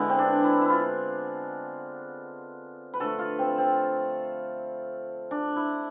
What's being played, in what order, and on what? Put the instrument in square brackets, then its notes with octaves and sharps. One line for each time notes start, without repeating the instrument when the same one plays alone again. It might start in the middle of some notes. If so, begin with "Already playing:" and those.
Already playing: [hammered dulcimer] D3 G#3 B3 E4
C4
D4
E4
E4
F4
B4
D3 F3 A3 A4
F4
C4
C4
D4
E4